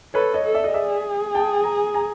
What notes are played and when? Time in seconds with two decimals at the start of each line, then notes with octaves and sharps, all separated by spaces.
0.14 A4 B4 C#5
0.34 C#5 D#5
0.44 A4
0.54 D5 E5
0.64 D#5
0.74 G#4 D5 E5
1.34 G5 A5
1.64 G#5 A#5
1.94 G#5 A#5